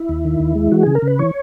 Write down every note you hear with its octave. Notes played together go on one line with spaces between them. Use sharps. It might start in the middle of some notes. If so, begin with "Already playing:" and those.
Already playing: E4
D#2
D#3
D#2
G#3
E3 F#4
C#3 G#4
A#4
C#3
B4
E3 C#5